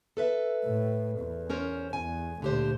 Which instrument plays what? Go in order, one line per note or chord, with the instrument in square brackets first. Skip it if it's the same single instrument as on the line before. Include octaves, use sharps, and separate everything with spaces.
[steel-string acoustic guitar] A4 B4 E5
[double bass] A2
E2
[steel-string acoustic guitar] C#4 A#4 C5
[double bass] E2 [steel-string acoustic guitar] G#5
[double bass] D2 A#2 [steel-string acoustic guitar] D3 G4 C5